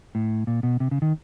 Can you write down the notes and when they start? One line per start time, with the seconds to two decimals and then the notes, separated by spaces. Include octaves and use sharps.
0.15 A2
0.47 A#2
0.63 B2
0.80 C3
0.91 C#3
1.02 D#3